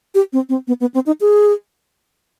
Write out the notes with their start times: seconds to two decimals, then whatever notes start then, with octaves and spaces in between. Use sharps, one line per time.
0.15 G4
0.33 C4
0.49 C4
0.68 B3
0.81 B3
0.94 C4
1.06 D#4
1.21 G#4